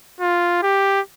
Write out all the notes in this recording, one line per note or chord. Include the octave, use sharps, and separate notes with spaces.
F4
G4